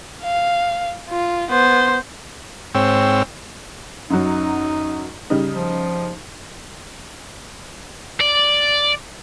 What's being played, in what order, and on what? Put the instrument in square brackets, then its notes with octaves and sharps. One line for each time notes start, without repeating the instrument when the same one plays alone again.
[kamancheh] F5
F4
B3 C5
[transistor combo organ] G#2 C4 C#5 G5 E6
[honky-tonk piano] F#2 F#3 [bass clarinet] D#4
[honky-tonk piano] C#3 G3 D#4
[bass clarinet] F3
[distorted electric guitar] D5